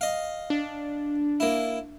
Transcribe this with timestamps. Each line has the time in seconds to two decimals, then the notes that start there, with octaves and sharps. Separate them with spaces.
0.01 D#5 F5
0.50 D4
1.40 A#3 E4